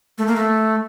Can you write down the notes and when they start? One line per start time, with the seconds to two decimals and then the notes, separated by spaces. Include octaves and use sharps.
0.18 A3
0.27 A#3
0.36 A3